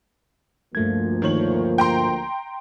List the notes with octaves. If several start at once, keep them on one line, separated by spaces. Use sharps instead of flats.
D2 G2 F3 A3 A#3 G#6
D#3 C#5 F#7
G5 A#5 C6